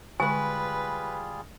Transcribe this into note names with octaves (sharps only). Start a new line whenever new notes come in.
D3 G3 G#3 F4 G#4 B4 G#5 C#6